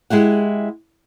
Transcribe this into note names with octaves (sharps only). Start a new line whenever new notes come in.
G#3 E4 G4 F#5